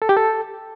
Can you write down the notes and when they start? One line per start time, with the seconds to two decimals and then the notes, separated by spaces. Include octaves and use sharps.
0.02 A4
0.09 G4
0.17 A4